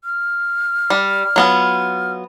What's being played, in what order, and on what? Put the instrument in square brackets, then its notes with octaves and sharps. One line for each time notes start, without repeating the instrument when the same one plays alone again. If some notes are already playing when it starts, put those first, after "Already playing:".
[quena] F6
[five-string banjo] G3
F#3 B3 F4